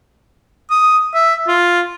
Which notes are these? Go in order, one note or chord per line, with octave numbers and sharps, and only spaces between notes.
D#6
E5
F4